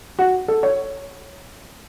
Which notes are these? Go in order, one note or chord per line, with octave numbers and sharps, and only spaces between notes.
F#4
A4
C#5